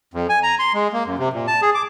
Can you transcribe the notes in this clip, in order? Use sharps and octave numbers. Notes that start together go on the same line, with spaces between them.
F2
G#5
A#5
C6
G#3
A#3
F#2
C3
A#2
A5
G#4
D6